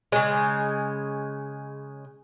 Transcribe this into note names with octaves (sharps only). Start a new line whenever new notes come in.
C#3 G#3